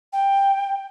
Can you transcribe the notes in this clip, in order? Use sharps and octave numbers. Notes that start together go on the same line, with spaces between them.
G5